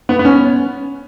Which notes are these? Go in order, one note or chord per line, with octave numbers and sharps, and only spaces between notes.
B3
B3
C#4